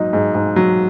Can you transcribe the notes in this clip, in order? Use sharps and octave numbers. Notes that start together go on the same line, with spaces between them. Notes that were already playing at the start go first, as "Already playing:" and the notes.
Already playing: G#2 F#3 D#4
G#2
G#2
F#3